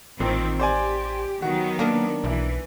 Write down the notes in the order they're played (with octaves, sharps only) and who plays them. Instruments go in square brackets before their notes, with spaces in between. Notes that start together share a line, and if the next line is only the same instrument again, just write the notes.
[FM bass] A1 [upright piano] A#2 [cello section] D#3 C4
[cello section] G4 [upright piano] C5 D5 G#5
[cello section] D#3 F#3 B3 [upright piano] F#4
[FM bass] A#3 [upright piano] D4 A#4
[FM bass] B1 [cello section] E3